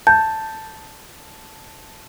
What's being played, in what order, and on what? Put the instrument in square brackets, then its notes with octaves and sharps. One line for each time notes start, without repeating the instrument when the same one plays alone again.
[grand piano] A5 [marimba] G6